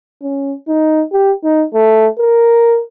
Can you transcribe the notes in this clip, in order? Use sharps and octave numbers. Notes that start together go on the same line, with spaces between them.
C#4
D#4
G4
D#4
A3
A#4